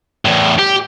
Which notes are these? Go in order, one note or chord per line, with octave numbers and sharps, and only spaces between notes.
E2 A2
G4